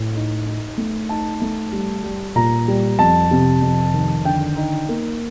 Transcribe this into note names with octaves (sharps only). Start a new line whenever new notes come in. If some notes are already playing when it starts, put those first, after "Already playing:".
Already playing: A2
D#4
D#4
A3
D#4 A5
A3
G3
G3
A#2 A#5
G3
F2 A5
C3
F2
D#3
D3 G5
D#4
A#3